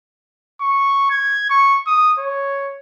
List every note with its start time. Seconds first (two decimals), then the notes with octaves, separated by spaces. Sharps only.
0.61 C#6
1.10 G#6
1.50 C#6
1.87 D#6
2.19 C#5